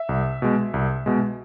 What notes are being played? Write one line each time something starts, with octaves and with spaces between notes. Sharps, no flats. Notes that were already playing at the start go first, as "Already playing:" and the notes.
Already playing: E5
C2
B2 G#3
C2
B2 G#3